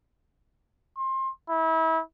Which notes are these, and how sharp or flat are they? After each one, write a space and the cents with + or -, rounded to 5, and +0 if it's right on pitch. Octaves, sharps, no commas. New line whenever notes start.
C6 +25
E4 -30